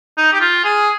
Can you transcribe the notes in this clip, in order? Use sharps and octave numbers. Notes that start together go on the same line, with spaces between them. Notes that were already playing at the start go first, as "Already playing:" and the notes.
D#4
G4
F4
G#4